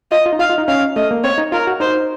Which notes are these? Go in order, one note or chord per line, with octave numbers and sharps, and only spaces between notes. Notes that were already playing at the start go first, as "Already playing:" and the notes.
F4 D#5
F4
D#4
F4 F5
F4
D#4
C#4 F5
A3 D#5
A#3
C4 C#5
D#4
F4 A#4
F#4
D#4 C5